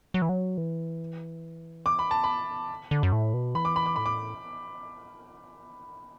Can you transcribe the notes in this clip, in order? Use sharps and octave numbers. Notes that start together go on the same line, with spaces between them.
F#3
E3
F#3
E3
D6
B5
A5
B5
D3
D3
F#2
A2
B2
E3 B5
D6
B5
D6
A2 B5
D6